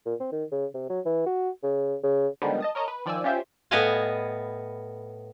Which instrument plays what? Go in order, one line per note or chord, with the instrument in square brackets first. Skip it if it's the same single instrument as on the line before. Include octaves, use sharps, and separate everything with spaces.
[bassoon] A#2
C4
D#3
C#3
C3
F#3
E3
F#4
C#3
C#3
[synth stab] D3 D#3 F3 G3 G#3 B3
D#5 A5 D#6
A#4 C#5 D#5 A5 A#5
B4
D#3 F3 D5 G5 G#5 E6
C#4 F4 G4 C5 E5 G6
[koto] A2 B3 D#5 F5 G#5 A5